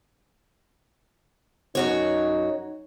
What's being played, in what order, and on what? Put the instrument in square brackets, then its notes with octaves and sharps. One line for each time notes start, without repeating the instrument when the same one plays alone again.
[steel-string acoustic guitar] F#2 F#4 C#5 [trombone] D#4